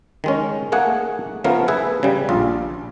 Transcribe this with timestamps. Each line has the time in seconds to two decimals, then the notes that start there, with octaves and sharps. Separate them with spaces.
0.24 D#3 G#3 C#4
0.72 A3 A#3 G#4 F#5
1.44 C#3 F3 A3 B3 A#4
1.68 G#4 B4 E5
2.03 C#3 G3
2.29 A#1 F4